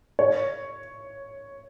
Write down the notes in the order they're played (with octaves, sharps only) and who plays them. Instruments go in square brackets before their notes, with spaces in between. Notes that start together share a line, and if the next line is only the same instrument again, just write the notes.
[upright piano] C#5